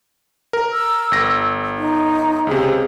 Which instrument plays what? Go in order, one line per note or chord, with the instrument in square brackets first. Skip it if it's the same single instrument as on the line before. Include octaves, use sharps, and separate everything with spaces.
[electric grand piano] A#4
[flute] E6
[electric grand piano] G1 A#6
[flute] D#4
[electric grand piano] C#2 C3 [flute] G#4